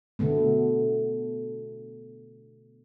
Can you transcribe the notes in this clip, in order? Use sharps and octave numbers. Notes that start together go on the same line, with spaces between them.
B2 D3 A3 B3